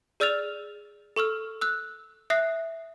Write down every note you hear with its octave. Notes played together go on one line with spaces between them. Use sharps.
G#4 D5 E6 F6 A6 F7
A4 C#6 E6 F6
E6 F#6
E5 D#6 F#6 A#6 C7